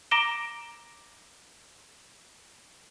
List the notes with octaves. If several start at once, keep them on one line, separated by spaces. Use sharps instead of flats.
A#5 D6 A#6 D7 E7 G7